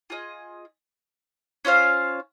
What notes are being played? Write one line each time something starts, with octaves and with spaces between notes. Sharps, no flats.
F4 G#4 D#5
C#4 F4 C5 F5